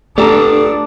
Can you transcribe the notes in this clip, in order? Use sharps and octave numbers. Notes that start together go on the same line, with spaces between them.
A3 D4 G4 A4 D5 A#5